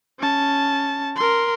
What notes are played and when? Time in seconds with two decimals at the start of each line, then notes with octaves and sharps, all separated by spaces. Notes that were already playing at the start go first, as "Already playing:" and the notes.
0.20 C#4 A5
1.16 A#4 C6